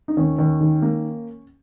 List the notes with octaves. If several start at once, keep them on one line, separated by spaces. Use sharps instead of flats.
D#4
D#2 C#4
D#2
D#3
A#3